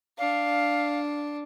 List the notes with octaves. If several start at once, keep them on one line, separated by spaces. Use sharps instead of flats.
D4 F5